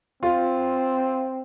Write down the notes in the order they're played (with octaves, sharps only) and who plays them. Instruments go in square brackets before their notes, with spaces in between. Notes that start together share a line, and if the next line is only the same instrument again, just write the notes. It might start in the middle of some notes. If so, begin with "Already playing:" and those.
[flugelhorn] C4 [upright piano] F4